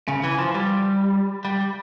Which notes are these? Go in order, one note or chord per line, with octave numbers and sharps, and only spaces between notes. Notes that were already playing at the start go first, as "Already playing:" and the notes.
C#3
E3
F3
G3
G3